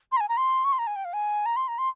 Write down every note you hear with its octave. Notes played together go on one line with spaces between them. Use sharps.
C6
A#5
G#5
A#5
C6
C#6
C6
A#5
G#5
G5
F5
G#5
A#5
C6
A#5
C6